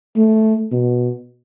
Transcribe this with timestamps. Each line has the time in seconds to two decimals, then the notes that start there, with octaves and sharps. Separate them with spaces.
0.17 A3
0.72 B2